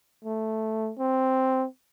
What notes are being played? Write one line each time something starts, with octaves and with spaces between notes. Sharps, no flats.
A3
C4